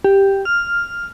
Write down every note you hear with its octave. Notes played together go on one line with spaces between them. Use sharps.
G4
F6